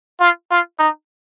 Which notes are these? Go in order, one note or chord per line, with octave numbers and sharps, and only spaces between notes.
F4
F4
D#4